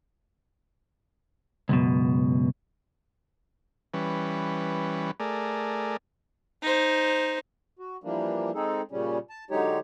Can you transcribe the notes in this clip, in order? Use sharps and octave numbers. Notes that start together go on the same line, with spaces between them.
C#2 F#2 B2
E3 G3 C#4 B4
A3 G#4 A#4 D5
D#4 C5
F#4
E3 F3 G3 A#3 D4
G#3 C4 D#4 G#4 A4
A#2 C#3 G3 C#4
A5
D3 F#3 G#3 D#4 G4 C#5